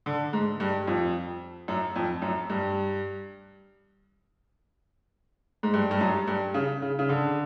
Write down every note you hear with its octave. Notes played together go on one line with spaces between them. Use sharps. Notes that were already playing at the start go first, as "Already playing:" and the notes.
D3
G#2
G2
F2
F#2
F2
F#2
G2
G#2
G2
G2
F#2
G2
C#3
C#3
C#3
D3